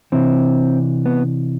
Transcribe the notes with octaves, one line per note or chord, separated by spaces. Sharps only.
C3 E3 C4
B3